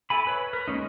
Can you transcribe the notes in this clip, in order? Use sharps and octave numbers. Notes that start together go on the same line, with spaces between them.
E4 A4 G#5 B5
B4 C#5
A#4 B4
G#3 A#3 C#4 D#4